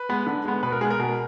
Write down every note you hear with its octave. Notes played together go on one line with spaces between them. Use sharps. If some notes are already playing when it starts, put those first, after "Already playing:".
Already playing: B4
G#3 B3
D3
G#3 B3
B2 B4
A#4
G#3 B3 G#4
A#4
B2